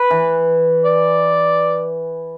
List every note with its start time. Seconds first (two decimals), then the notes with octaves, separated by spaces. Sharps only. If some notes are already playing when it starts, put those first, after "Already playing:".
Already playing: B4
0.10 E3
0.85 D5